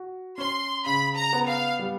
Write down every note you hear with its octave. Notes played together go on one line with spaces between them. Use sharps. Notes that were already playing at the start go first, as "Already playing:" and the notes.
Already playing: F#4
C#4 C6
C#3 B5
A#5
B3
F5
G3